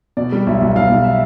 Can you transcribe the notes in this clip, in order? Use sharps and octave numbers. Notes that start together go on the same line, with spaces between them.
B2 D5
G3
B1 E5
B1
B1 F5
B1
E5